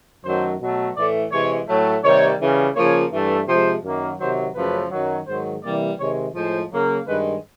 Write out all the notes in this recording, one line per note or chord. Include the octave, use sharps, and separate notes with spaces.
F#2 D#3 F#3 A3 C5
B2 F#3 A3
A2 E3 A3 D5
C3 E3 G#3 C#5
A2 F#3 A3
C3 D#3 G3 A#3 C#5
C#3 E3 G3
C#3 F3 A#3 C#5
G2 E3 A3
C3 F3 G#3 C5
F#2 D#3 F#3 A#3
C3 D#3 F#3 C5
F#2 C#3 F3 A3 B4
F#2 D#3 F#3
G#2 D#3 F#3 C5
C3 E3 G3 A#3 D5
C3 D#3 G#3 C#5
A2 F3 G#3 C5
C#3 F#3 A#3
G2 D#3 G#3 B4